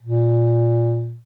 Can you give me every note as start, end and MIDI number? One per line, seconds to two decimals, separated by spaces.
0.02 1.18 46